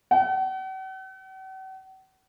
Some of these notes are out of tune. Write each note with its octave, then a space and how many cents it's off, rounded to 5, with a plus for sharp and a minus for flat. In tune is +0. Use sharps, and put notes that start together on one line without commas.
F#5 +45